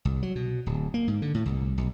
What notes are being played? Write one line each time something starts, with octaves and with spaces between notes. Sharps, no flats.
C2
F#3
B2
D1
A#3
G#2
D3
A2
C2
B1